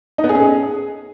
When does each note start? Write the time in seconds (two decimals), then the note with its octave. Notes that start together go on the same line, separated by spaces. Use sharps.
0.18 D#4
0.24 B3
0.29 G#4
0.35 C#4
0.40 G#4